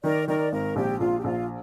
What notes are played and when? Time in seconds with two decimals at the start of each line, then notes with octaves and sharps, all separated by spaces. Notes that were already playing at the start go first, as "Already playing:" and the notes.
0.04 D#3 A#4 D5
0.28 D#3 A#4 D5
0.52 G#1 A#4
0.76 A#1 G4
1.00 A#1 F4
1.19 G4
1.24 A#1 F4